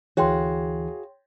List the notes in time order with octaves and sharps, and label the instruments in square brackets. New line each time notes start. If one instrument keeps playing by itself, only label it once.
[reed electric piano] D2 E3 [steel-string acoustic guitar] F#4 G#4 F5 [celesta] C#5 G5 C6